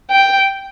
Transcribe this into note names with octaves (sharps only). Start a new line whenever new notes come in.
G5